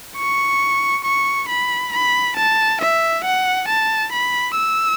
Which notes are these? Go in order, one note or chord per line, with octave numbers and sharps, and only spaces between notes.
C#6
C#6
B5
B5
A5
E5
F#5
A5
B5
E6